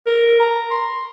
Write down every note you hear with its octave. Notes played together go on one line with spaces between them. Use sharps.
A#4
A#5
C6